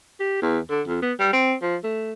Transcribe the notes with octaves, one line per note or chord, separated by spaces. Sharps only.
G4
E2
D3
F2
B3
G3
C4
F3
A3